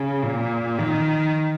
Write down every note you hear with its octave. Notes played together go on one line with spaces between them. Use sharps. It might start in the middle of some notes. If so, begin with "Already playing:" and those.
Already playing: C#3
A#2
D#3